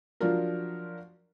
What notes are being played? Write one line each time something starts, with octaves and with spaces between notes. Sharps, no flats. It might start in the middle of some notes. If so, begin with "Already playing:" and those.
F3 F#3 D4 F4 F#4 A#4